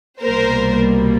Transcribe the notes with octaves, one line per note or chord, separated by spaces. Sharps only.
C2 B2 G3 A#3 A#4 C5